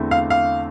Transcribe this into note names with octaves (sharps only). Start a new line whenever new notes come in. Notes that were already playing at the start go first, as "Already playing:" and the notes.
Already playing: E2 D3 A3 C4 E4
F5
F5